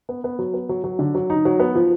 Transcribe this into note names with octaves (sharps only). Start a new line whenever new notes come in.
B3
B3
F#3
B3
F#3
F#3
D3
F#3
D#4
F#3
B3
F3